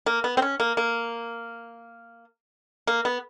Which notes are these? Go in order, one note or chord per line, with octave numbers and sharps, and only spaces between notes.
A#3
B3
C4
C#4
A#3
A#3
A#3
B3